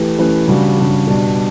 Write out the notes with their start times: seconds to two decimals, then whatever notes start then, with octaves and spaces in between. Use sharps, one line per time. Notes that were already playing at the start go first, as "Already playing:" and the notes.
Already playing: E3 A3 G4 B4
0.18 E3 A3 C#4 G4 B4
0.48 C#3 G3 D4 F#4
0.77 C#3 G3 D4 F#4
1.07 B2 G3 D4